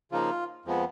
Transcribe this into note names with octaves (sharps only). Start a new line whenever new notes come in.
C#3 F3 A#3 D#4 F4
F2 F3 G#3 B3